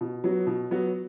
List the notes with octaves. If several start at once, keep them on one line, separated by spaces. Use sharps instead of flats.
B2
F#3 B3 F#4
B2
F#3 B3 F#4